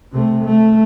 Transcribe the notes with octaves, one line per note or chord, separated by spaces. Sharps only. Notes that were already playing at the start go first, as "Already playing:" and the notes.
C3 A3
A3